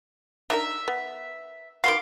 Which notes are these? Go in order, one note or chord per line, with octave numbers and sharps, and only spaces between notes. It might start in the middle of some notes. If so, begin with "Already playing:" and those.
D4 D#4 A#4 E5
B3
D#3 B3 F#4 F5 C6 D6